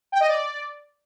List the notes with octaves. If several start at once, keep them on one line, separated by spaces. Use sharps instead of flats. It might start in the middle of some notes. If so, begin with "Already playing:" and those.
G5
D#5
D5